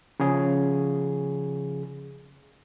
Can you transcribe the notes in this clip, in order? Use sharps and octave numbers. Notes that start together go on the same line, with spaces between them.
C#3 F3 G#4